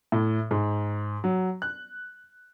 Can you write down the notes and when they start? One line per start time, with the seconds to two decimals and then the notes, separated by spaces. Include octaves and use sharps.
0.12 A2
0.51 G#2
1.24 F#3
1.62 F#6